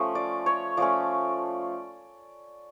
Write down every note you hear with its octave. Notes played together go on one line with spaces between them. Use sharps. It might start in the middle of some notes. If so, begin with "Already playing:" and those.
Already playing: F3 A3 C#4
D5
C#5
F3 A3 C#4 D5